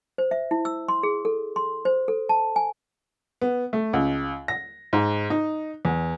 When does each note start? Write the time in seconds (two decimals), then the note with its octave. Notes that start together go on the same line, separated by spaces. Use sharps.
0.18 C5
0.31 E5
0.51 E4
0.65 E6
0.88 C6
1.03 G#4
1.25 A4
1.56 C6
1.85 C5
2.08 A4
2.29 A5
2.56 G#5
3.41 B3
3.73 A3
3.93 C#2
4.48 A#6
4.93 G#2
5.30 D#4
5.85 E2